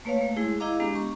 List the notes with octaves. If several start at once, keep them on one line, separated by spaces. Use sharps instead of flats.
A3 A#3 B4 C#5 F5
A3
G#3 E4 G#4
E4 G#4 D#5 F5 A#5 D6
G#3 B3 D4 G4
A#5 C#6